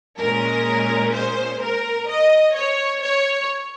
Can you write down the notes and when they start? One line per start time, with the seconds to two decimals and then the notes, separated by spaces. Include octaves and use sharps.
0.20 A#2 G#3 C#4 A#4
1.14 C5
1.62 A#4
2.09 D#5
2.56 C#5
3.03 C#5